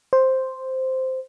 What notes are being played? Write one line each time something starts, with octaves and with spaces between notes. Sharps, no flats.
C5